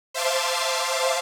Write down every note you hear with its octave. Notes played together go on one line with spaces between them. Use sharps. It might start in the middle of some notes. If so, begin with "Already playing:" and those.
C5 E5 F5 A5 C6 D6